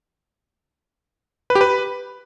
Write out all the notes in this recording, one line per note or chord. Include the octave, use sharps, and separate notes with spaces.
B4
G4
B4